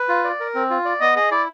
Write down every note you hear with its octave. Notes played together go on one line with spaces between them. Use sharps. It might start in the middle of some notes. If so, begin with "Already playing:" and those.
Already playing: B4
F4
D5
A#4
C4
F4
D5
B3 D#5
G#4 D#5
E4 D5